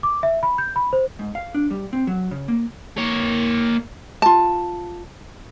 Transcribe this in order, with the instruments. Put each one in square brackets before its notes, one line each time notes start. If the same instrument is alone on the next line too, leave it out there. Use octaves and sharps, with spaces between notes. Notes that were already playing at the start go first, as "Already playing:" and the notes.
[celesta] D6
E5
B5
G6
B5
C5
[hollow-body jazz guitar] G#2
F5
D4
G3
C4
F#3
C#3
A#3
[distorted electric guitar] A#3 C#5
[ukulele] F4 A5